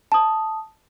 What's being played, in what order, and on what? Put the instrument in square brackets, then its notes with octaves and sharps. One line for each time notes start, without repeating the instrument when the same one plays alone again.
[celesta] A5 D#6